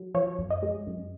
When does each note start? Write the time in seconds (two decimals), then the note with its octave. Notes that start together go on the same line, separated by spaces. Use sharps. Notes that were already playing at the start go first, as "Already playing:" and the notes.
Already playing: F#3
0.14 F3 C#5
0.39 F#2
0.50 D#5
0.62 G#3
0.87 F#2